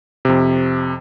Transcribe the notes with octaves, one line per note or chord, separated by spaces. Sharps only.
F2 C3